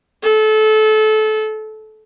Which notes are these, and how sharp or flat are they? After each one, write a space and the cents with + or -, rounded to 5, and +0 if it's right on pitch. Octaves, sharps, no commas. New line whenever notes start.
A4 -25